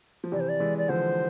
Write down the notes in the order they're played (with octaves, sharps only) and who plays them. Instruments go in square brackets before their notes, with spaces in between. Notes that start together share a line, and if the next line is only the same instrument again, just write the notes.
[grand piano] F3
[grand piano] C3 E3 [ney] D5
[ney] C5
D5
[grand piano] E3 G#3
[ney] D5
[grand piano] D3 F3 [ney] C5